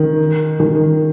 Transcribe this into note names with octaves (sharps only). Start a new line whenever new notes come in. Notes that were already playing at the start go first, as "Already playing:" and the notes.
Already playing: D#3
D#3